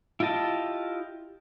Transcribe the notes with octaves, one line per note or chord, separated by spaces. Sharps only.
E4 F4 G4 D#5 A5